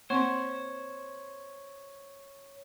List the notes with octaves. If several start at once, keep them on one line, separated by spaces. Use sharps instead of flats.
A#3 C4 C5 C#5 C6